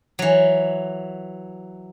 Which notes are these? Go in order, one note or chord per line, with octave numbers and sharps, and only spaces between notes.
E3 F#3